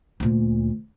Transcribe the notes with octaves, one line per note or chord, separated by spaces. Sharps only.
D2 A#2